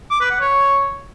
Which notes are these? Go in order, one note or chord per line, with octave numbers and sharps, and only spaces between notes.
D6
B4
F#5
C#5